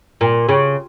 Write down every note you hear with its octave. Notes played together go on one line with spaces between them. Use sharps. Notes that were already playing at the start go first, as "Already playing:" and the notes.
A#2
C#3